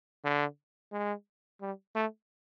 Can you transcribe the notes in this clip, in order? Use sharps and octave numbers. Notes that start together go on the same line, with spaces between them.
D3
G#3
G3
A3